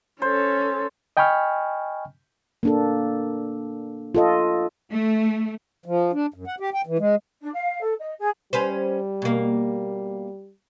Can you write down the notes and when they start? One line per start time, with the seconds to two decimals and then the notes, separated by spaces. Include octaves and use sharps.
0.22 C#4 A4 C5
1.17 D#5 G5 G#5 B5 C#6 F6
2.63 A#3 D4 A4
4.15 F4 A4 D#5
4.92 A3
5.86 F3
6.13 D4
6.34 F#2
6.47 F#5
6.60 G4
6.74 G5
6.87 E3
6.99 G#3
7.41 D4
7.54 F5
7.81 A4
8.00 D#5
8.18 G#4
8.53 G3 C#4 B4 C5
9.22 B2 A#3